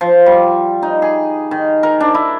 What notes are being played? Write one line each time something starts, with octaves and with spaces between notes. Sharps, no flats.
F3
G3
D#4
G#4
D#3
A#4
D4
E4